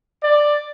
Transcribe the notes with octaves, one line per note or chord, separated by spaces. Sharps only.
D5